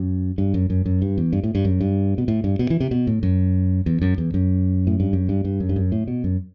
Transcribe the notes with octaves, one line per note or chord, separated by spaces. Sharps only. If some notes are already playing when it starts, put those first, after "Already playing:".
Already playing: F#2
G2
F#2
F#2
F#2
G2
E2
G2
A2
G2
F#2
G2
B2
A2
G2
B2
E3
C3
B2
A2
F#2
E2
F#2
E2
F#2
A2
G2
F#2
G2
G2
F#2
G2
F#2
A2
B2
F#2